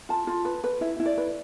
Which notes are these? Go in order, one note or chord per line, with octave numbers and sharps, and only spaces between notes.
F4 A5
F4
B4
B4
E4 E5
E4
D5
B4